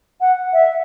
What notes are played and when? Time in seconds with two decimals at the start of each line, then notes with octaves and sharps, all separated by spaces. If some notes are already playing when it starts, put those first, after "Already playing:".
0.21 F#5
0.53 E5